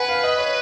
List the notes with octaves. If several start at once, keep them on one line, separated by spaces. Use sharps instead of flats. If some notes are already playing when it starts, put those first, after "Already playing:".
Already playing: B4 F#5 G#5
F5
D#5
C#5